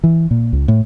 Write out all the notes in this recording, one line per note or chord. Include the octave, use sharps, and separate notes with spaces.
E3
A#2
C#2
A2